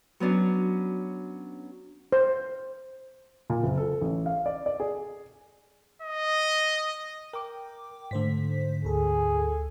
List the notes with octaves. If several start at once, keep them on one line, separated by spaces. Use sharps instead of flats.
F#3 B3 C#4 D4
C5
A#2
F#1
A4
A1
F5
D5
D5
G#4
D#5
A#4 G5 D6
G#2 D3 A3 C5 B6
D2 G#4 A4